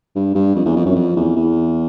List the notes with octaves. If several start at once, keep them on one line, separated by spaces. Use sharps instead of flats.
G2
G2
F2
E2
F2
F#2
F2
E2
E2